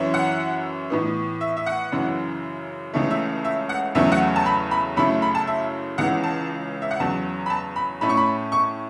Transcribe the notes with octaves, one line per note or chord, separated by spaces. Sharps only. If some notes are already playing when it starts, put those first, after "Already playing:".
Already playing: F#2 E3 C#4 E4
F#5
A2 E3 B3
E5
E5
F#5
F#2 C#3 E3
C#2 C#3 E3 A3
E5
E5
F#5
E2 C#3 F#3 A3 E4 E5
F#5
A5
B5
B5
F#2 C#3 A3 E4 B5
B5
A5
E5
C#2 C#3 E3 F#5
A5
E5
F#5
E2 C#3 F#3 A5
B5
A5
B5
A2 A3 C#4 E4 B5
C#6
B5
C#6